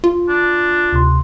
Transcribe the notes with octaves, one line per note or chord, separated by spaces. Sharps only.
F4
D4
D2 C3 C6